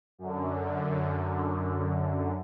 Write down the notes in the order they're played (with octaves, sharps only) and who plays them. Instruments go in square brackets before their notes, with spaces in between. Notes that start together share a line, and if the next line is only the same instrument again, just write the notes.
[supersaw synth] F#2 D3